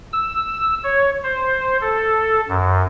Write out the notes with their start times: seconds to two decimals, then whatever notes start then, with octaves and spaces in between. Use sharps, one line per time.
0.13 E6
0.84 C#5
1.23 C5
1.81 A4
2.49 F#2